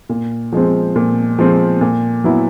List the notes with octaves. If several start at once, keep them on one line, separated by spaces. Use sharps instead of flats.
A#2
F3 G#3 C4
A#2
F3 G#3 C4
A#2
F#3 B3 E4